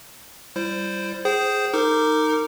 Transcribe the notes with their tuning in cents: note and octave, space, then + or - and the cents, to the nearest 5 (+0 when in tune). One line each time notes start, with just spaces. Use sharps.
G3 +0 E4 +40 C5 +0
G#4 +0 C5 +0 G5 -35
D#4 +0 A#4 -30 D6 +0